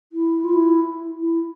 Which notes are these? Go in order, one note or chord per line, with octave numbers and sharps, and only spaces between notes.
E4
F4
E4
E4